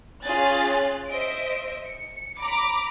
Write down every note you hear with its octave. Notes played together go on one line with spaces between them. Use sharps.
C#4 F4 G#4 F#6 A6
C5 D#5 E5 D7
C#7
A#5 B5 D6